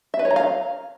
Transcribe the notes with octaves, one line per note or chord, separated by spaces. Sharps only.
E5
B4
C#5
A#5
F5